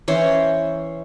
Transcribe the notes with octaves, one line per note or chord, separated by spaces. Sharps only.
E3 C#4 C5 C#5